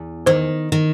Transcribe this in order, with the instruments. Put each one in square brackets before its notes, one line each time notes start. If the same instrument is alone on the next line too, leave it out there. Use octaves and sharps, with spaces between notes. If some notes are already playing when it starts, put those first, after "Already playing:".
Already playing: [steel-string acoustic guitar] E2
[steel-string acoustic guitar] D#3 [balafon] C5
[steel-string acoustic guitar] D#3